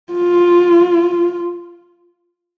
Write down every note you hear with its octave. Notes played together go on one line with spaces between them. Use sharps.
F4